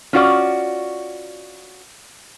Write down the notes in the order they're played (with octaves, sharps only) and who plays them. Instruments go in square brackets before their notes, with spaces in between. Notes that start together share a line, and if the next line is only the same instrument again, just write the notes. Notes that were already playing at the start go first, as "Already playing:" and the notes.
[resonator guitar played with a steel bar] C#4 F4 F#4 D5